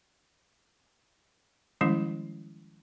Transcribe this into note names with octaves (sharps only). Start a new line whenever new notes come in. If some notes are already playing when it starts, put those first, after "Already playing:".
D#3 F3 G3 G#3 C#4 E4